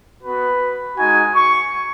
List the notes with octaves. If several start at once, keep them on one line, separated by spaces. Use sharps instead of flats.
B3 F#4 B4
G#3 D#4 F#4 G#5
C#6